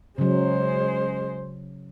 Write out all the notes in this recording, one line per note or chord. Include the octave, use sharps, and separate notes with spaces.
C#3 F#3 G#3 C5